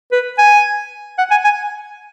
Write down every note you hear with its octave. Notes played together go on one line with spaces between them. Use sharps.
B4
G#5
F#5
G#5
G#5